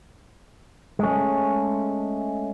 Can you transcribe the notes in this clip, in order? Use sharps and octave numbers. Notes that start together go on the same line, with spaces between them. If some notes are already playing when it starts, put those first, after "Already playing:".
G#3 A3 C#4